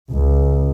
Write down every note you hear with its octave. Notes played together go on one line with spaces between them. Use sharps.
C#2